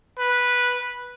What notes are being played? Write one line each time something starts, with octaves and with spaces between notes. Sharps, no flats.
B4